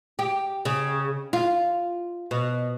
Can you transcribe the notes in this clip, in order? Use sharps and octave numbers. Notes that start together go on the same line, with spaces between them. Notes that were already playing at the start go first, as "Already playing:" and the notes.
G4
C#3
F4
B2